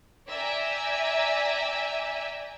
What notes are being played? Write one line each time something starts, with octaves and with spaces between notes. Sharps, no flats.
D5 E5 G5 G#5 A#5